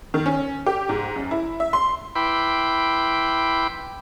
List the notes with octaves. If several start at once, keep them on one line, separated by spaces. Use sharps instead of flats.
D#3
C#4
G4
G#2
F#2
E4
E5
C6
E4 B4 G5 B5 C6 D6